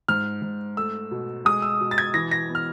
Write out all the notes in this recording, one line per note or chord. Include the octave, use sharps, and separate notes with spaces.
G#2 F6
G#2
A3 E6
B2
G#3 D#6
E6
B2
A6
G#6
E3 A#6
A#6
B3
F6